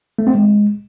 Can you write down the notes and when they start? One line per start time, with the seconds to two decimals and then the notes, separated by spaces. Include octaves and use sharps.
0.19 A3
0.27 C4
0.35 G#3